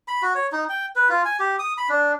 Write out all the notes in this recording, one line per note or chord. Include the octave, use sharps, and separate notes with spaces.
B5
F#4
C#5
D#4
G5
B4
F4
G#5
G4
D#6
B5
D4